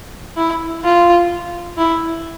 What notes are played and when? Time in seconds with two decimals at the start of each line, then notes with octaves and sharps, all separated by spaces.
0.37 E4
0.84 F4
1.78 E4